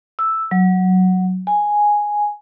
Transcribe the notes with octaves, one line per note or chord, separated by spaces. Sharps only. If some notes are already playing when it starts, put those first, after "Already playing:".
E6
F#3
G#5